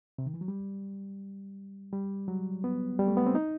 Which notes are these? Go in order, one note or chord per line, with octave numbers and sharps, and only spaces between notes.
C3
D#3
E3
F#3
G3
G3
F#3
B3
G3
A3
B3
C4
D#4